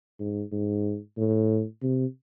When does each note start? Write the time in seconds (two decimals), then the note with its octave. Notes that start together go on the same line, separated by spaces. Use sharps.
0.19 G#2
0.51 G#2
1.17 A2
1.82 C3